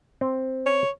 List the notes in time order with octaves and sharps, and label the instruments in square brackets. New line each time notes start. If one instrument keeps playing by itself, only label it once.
[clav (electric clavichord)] C4
[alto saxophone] C#5